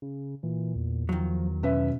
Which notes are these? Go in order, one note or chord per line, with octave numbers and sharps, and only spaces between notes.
C#3
A#2 E3
E2
D#3 F3 F#3
B2 C#4 B4 E5